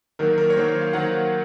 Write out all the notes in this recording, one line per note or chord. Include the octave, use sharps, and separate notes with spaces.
D#3 F#3 A#3 A#4
A#4
C#5
D#3 F#3 A#3 C5
C#5
F5
D#3 F#3 A#3 F#5